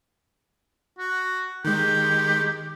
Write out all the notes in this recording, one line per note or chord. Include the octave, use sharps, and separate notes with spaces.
F#4
D#3 G#3 G4